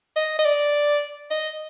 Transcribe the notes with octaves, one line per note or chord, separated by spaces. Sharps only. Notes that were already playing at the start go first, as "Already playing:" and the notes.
D#5
D#5
D5
D#5